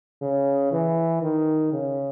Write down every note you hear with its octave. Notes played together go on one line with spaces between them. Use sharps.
C#3
E3
D#3
C#3